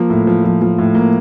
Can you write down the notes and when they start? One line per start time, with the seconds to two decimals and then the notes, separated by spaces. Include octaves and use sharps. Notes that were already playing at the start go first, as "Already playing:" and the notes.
Already playing: F3 A#3
0.10 A2
0.27 F3
0.44 F3
0.62 F3
0.79 A2
0.95 A#3